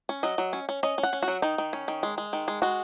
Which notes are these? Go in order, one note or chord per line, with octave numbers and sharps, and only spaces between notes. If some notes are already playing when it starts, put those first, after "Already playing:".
C#4
F#3 D#5
F#3
C#4
C#4
C#4 D#5
C#4
F#5
C#4
F#4
F#3
D#3 D#4
D#3
C#4
D#3
G#3
G#3
D#3
G#3
G#3 F#4